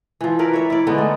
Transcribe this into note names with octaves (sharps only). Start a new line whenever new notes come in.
E3 F3
E4 A#4 B4 D5
C#5 E5
E4 D5
D3 G#3 B3 D#4
A3